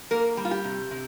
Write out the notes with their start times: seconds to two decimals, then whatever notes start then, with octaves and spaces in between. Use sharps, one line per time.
0.11 A#3 A#4
0.37 G3
0.45 F4
0.51 G4
0.64 C3
0.91 C3